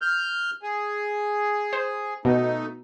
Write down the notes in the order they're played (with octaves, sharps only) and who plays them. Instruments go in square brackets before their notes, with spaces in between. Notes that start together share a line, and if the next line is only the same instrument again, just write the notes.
[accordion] F6 G6
G#4
[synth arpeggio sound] C5
[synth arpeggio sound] B2 [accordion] A3 D#4